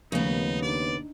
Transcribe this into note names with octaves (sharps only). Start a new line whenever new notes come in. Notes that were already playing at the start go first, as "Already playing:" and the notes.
D#2 C#3 F3 A3 B3 D#4
D4 D#4 D5